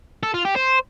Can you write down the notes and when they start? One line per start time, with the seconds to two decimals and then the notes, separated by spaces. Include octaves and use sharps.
0.23 A4
0.34 F4
0.45 G4
0.56 C5